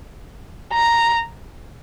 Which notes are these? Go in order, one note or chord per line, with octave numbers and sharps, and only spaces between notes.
A#5